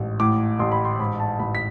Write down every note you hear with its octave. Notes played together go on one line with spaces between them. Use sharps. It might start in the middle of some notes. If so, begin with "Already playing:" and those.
Already playing: A1 G#2
A2 D6
A1 C6
B5
C6
G#2 B5
A5
A1 B5
B6